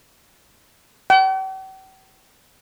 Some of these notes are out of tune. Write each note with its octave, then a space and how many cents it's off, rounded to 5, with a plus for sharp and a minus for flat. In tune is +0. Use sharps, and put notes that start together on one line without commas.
G5 -45